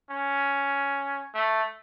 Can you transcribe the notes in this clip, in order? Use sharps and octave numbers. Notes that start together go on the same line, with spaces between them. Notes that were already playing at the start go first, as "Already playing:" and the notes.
C#4
A3